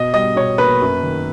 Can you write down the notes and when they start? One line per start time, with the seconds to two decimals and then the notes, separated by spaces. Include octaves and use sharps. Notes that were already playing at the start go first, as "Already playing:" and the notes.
Already playing: B2 D#5
0.14 G3 D#5
0.36 B2 C#5
0.58 A#3 B4
0.81 F#2
1.03 D#3